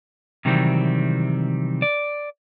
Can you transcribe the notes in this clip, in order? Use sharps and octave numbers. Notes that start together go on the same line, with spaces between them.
C3 D#3 E3 F#3 G3 C4
D5